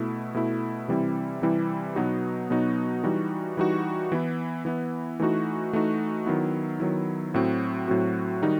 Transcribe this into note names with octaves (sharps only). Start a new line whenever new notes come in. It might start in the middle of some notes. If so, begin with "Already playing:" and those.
Already playing: B2 A3 E4
B2 A3 E4
C3 E3 G3 C4 E4
C3 E3 G3 C4 E4
B2 F#3 B3 D#4 F#4
B2 F#3 B3 D#4 F#4
E3 G3 D#4 F#4
E3 G3 D#4 F#4
E3 B3 E4
E3 B3 E4
E3 A3 D#4 F#4
E3 A3 D#4 F#4
D#3 F#3 B3 E4
D#3 F#3 B3 E4
A2 F#3 C4 F#4
A2 F#3 C4 F#4
D#3 G3 D#4 F#4